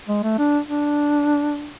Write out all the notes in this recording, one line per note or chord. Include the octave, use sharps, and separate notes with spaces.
G#3
A3
D4
D4